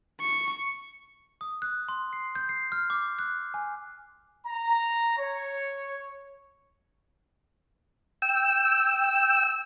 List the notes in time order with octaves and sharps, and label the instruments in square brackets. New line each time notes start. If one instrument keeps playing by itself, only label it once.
[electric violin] C#6
[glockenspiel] D#6
F#6
C6
C7
G6
C7
F6
D6
F#6
G#5
[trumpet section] A#5
C#5
[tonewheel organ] G5 E6